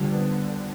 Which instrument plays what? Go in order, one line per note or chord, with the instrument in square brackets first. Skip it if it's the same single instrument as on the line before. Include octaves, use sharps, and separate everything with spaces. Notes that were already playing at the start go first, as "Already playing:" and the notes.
Already playing: [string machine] D3 [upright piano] F3 G3
[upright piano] B3